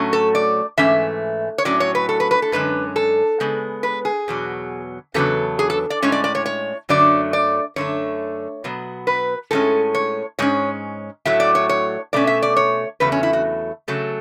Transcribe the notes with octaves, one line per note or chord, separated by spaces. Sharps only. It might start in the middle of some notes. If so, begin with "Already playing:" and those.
Already playing: A2 F#3 A3 C#4
A4
D5
G#2 E3 A3 C#4 E5
C#5
A2 F#3 C#4 D5
C#5
B4
A4
B4
B4
A4
F#2 D3 G#3 C#4 B4
A4
C#3 G#3 B3
B4
G#4
E2 B2 F#3
E2 C#3 F#3 B3 A4
G#4
A4
D5
A2 G#3 C#4 C#5
D5
D5
C#5
C#5
F#2 D3 F#3 A3 D5
D5
F#2 D3 A3 C#5
B2 F#3 B3
B4
A2 G#3 C#4 A4
C#5
G#2 G#3 C#4 C#5
A2 F#3 A3 E5
D5
C#5
C#5
B2 A3 C#4 D5
E5
D5
C#5
E2 C#3 F#3 A3 B4
C#4
E4
F#4
C#3 F#3 A3 A4